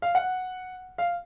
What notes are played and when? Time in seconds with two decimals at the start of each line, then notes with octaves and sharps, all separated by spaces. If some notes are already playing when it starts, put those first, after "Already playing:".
0.02 F5
0.15 F#5
0.98 F5